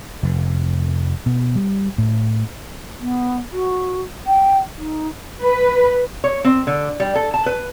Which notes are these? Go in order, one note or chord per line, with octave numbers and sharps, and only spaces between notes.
F1
B2
G3
A2
B3
F#4
G5
D#4
B4
C#5
C4
D3
G3
A4
A5
B4